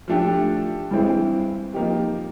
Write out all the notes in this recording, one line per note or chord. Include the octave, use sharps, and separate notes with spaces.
F3 A3 D4 G4
G2 E3 G#3 C4 E4
F3 A#3 D#4 G4